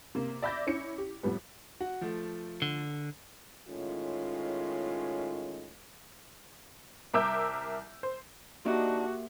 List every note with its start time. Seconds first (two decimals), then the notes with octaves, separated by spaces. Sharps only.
0.15 C3 A#3
0.42 D5 E5 B5 D6 G6 A#6
0.67 C#4 E4 C#7
0.98 G4
1.23 F2 A2 G3 B3
1.80 F#4
2.01 F3 A3
2.62 D3
3.68 A2 D#3 G#3 C#4 F4
7.14 C2 A#4 E5 D6 E6 G6
8.03 C5
8.65 A#3 D4 D#4 F#4 G4 E5